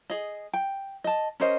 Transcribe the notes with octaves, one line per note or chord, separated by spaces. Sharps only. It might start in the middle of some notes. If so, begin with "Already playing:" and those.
G#4 D#5
G5
D#5 A5
C#4 A#4 C5 D#5